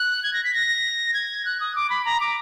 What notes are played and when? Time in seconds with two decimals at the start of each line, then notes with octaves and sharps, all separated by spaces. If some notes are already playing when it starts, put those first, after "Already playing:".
Already playing: F#6
0.23 G#6
0.33 A#6
0.44 B6
0.54 A#6
1.14 G#6
1.45 F#6
1.60 D#6
1.76 D6
1.90 B5
2.05 A#5
2.20 D6